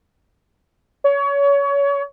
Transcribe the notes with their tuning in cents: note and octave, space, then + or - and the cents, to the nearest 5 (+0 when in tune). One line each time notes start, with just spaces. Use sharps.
C#5 +25